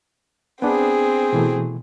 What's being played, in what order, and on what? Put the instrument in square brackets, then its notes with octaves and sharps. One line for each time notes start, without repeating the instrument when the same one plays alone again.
[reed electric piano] B3 D4 [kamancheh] C4 G#4
[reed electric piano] B2 E3 A3